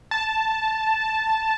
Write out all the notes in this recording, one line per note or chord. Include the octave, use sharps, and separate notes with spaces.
A5